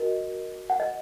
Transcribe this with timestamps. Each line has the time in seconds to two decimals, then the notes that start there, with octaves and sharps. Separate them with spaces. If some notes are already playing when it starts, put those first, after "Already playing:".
Already playing: F#4 A#4 D#5
0.70 F#5
0.80 D#5